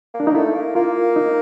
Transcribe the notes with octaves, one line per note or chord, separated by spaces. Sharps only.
A#3
D4
A#3 D#4
A3 E4
A#3
A#3 F4
D#4